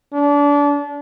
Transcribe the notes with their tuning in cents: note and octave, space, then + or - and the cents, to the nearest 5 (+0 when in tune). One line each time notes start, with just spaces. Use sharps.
D4 -30